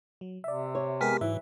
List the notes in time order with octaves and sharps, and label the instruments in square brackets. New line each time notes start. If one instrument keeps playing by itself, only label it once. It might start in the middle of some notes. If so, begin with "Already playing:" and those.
[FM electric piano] F#3
[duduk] C3 [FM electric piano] D5 E5
[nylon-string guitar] C#5
[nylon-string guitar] G#3 [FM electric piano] B3 G4 A#4 [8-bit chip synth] G#5 F6 B6
[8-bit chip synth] G#2 [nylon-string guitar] E3 F#3 [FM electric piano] E5